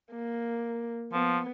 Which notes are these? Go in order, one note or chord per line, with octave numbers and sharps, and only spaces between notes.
A#3
F3 B3